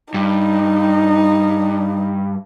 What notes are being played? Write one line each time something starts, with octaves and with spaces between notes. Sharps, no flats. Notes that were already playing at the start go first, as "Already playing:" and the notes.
G2 D#4